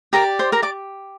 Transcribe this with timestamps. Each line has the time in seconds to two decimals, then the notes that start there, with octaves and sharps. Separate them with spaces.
0.13 G4 A#4 D5 A#5
0.39 C5 C6
0.52 A#4 A#5
0.62 D5 D6